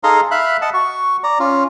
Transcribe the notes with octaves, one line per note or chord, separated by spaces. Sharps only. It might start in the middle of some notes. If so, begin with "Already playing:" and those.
D#4 G#4 A4 F5 A#5 C6
E5 F5 B5 F#6
D#5 F#5 A5
F#4 C#6
D5 A#5
C#4 F4